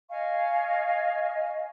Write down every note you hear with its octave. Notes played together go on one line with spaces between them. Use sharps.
D#5 F5 G#5 C#6